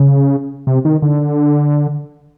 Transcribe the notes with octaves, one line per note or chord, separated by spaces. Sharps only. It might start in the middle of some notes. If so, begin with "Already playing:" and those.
Already playing: C#3
C3
D#3
D3